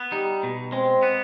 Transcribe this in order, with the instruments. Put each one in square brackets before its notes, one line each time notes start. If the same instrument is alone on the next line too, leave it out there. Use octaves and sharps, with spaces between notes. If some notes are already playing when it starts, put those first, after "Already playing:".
Already playing: [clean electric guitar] B3
[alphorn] G3 [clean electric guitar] D#4
[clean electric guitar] B2
[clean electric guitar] G#3 [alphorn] C4
[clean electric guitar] B3